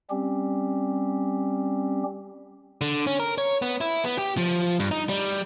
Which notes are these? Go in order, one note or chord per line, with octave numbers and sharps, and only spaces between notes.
G3 C4 C#4 G4
D3
C#4
A#4
C#5
B3
E4
B3
G4
F3
G2
D#4
G3